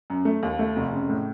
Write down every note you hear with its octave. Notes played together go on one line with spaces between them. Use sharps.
F#2
A3
D#2
A3
F1
C#3
A2